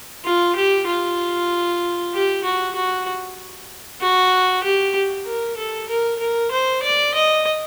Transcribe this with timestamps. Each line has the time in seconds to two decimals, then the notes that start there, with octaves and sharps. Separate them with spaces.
0.25 F4
0.56 G4
0.87 F4
2.14 G4
2.44 F#4
2.75 F#4
4.01 F#4
4.63 G4
5.26 A#4
5.57 A4
5.89 A#4
6.19 A#4
6.51 C5
6.83 D5
7.14 D#5